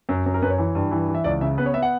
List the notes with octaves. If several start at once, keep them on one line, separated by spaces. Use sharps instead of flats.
F#2
F#2
A#4
F#2 B4
C#5
E3
G2
E3
E3
E5
C#2 D5
C#3 E5
B3 B4
C#5
B3 E5
F#5